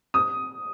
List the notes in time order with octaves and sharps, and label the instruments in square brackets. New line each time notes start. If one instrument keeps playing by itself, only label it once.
[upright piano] D#6